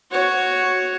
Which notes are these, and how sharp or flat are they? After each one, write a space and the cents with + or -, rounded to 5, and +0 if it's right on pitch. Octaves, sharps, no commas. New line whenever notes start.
F#4 +0 C#5 +0